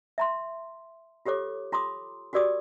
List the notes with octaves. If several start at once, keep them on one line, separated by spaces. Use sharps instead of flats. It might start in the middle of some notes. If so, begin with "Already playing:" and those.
E5 A#5 C6
F4 G4 A4 C#5 D6
F4 A#5 C6 D6 D#6
F#4 G4 A#4 D5 D6 D#6